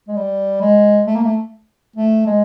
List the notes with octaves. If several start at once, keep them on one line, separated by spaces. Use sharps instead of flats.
G#3
G3
G#3
A3
A#3
A3
A3
G#3